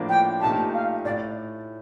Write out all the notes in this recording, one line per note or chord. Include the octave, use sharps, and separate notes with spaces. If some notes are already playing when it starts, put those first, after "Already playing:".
Already playing: A2 F3 A#3 D4
G5
A#2 A3 D#4 G4 A5
F5
A2 D5